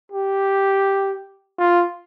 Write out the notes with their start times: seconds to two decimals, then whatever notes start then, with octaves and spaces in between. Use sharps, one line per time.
0.12 G4
1.58 F4